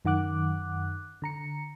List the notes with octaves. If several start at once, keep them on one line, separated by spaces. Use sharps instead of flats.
F#2 D#3 F#5 D6 F#6
D3 A#5 C#7